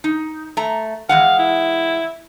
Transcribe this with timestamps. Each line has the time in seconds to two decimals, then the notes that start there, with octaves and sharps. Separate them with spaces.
0.04 D#4
0.57 A3 A#5
1.09 E3 G#3 F5 F#5
1.39 E4